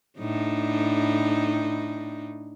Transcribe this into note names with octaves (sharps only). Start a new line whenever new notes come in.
A2 D4 D#4